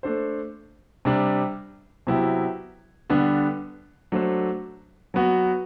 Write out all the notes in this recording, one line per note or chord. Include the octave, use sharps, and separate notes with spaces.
A3 D4 A4 C5
C3 G3 D4
C3 F#3 B3 E4 G4
D3 G3 B3 D4
F#3 A3 D4 A4 C5
F#3 B3 F#4